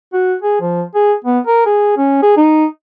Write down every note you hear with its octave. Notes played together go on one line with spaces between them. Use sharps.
F#4
G#4
F3
G#4
B3
A#4
G#4
C#4
G#4
D#4